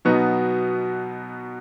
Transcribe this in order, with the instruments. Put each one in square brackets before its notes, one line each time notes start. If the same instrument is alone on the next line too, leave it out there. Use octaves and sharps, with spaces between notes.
[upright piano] B2 F#3 B3 D#4 F#4